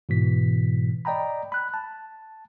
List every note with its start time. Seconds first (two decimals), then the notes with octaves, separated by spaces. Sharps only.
0.09 G#2 B2 E3 B6
1.05 D5 D#5 G5 A#5 B5
1.52 B5 F#6
1.74 A5